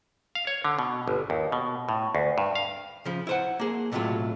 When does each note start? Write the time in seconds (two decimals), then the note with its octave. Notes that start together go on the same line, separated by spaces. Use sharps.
0.35 F5
0.47 C#5
0.65 D3
0.79 B2
1.08 G1
1.30 D#2
1.52 B2
1.89 A2
2.15 D2
2.38 G2
2.55 F5
3.05 C#3 F3
3.27 E4 C5 F#5
3.60 A#3 G#4
3.92 B1 A2 C3 E3 F#3 F4